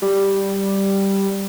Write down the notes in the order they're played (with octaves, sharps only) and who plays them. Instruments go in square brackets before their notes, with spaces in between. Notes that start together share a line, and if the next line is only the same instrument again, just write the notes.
[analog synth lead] G3